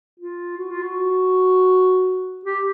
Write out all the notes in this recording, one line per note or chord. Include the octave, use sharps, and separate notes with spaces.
F4
F#4
F4
F#4
G4